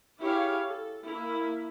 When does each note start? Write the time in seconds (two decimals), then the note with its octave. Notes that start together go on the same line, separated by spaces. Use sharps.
0.21 E4 G4 G#4 C#5 F5
0.64 A4
1.05 A#3 E4